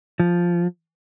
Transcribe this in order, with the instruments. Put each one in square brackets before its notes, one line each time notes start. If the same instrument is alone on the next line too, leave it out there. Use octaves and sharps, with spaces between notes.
[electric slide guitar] F3